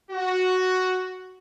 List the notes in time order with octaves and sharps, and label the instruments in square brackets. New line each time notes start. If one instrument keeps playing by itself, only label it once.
[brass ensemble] F#4